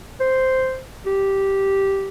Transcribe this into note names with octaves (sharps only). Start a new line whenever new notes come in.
C5
G4